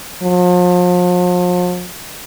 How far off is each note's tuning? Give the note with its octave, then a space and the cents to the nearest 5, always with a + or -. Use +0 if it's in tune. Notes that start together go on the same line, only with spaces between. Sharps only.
F3 +40